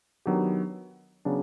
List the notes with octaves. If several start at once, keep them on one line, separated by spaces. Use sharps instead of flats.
D#3 F#3 B3 D4 G4
C#3 F#3 B3 D4